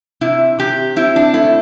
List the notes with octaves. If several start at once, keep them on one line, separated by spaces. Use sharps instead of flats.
C3 E4
C3 G4
C4 E4
D4
A3 E4